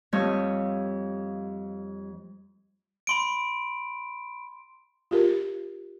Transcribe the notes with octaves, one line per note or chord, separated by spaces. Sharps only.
F2 G3 A3 F4 C#5 D#5
B5 C6 D7
F4 G4 A#4